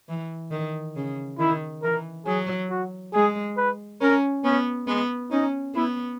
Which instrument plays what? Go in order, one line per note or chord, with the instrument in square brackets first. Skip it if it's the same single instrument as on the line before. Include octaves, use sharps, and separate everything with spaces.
[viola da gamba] E3
D#3
C#3
[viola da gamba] D#3 [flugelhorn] E4
[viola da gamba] E3 [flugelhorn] A#4
[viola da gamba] F#3 [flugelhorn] G#4
[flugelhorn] F#4
[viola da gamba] G#3 [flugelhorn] G#4
[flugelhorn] B4
[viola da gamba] C#4 [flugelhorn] A#4
[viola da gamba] B3 [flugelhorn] C#4
[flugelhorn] G#3 [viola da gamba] B3
[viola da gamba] C#4 [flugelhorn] D#4
[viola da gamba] B3 [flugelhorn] E4